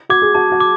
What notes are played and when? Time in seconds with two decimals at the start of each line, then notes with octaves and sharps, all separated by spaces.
0.09 F#4 D6 G#6
0.22 G#4
0.35 F#4 A5
0.52 F#4
0.60 D6